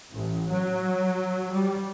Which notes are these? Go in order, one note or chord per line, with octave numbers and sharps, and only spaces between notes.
A1
F#3
G3